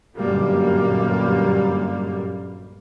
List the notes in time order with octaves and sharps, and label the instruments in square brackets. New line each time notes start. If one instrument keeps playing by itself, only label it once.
[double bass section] G1 F#2 A#2 G3 A#3